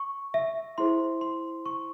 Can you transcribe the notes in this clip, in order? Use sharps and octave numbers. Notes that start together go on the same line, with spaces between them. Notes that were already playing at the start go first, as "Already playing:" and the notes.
Already playing: C#6
E5
E4 G#4 C5 C6
C6
C#6